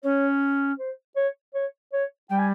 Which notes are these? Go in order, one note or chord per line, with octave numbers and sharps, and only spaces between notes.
C#4 C#5
C5
C#5
C#5
C#5
G3 G5
G#5